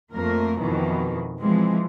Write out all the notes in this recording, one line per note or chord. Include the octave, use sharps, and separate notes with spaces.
F2 A3 A#3 A#4
F2 B2 D#3 E3
E3 F3 G#3 C4